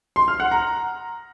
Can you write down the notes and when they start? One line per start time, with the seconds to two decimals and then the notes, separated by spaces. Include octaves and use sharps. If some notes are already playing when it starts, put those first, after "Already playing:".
0.16 C6
0.28 F6
0.40 F#5
0.51 A#5